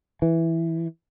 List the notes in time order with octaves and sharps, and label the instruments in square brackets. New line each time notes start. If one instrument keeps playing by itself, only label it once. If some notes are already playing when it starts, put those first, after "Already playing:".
[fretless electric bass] E3